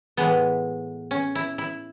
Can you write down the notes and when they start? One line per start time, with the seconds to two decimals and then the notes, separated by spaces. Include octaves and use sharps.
0.17 A2 E3 G#3 B3
1.11 C#4
1.35 E4
1.58 E4